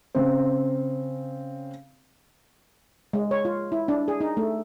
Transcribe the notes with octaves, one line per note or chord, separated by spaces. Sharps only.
C#3 C4
G#3
C#5
F4
E4
D4
G#4
D#4
A3